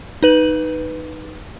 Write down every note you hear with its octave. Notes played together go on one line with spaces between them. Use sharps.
D#4 B4 F#7